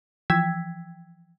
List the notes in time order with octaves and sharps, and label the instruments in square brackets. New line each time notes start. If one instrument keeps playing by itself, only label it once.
[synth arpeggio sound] E3 F3 G5 E6 G#6 B6